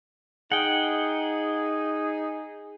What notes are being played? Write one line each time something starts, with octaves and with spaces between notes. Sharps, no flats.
D#4 G#4 F#5 G5